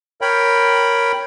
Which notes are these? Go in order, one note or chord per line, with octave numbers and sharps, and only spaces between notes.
A#4 C#5 G5 B5